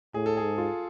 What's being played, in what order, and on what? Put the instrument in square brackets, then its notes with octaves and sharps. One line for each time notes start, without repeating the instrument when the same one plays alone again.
[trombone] A2 [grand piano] G#4
[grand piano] A4
G#4
[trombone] G#2
[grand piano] F4